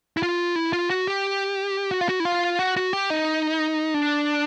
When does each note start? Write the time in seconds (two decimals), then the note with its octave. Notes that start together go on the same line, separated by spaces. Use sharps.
0.17 E4
0.23 F4
0.56 E4
0.73 F4
0.90 F#4
1.07 G4
1.91 F#4
2.01 F4
2.09 F#4
2.20 E4
2.25 F4
2.59 F#4
2.77 F#4
2.93 G4
3.10 D#4
3.94 D4